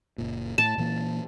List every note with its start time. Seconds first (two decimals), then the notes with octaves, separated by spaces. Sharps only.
0.18 F#1 A#2
0.58 A2 A5
0.78 A#2 E3 A#3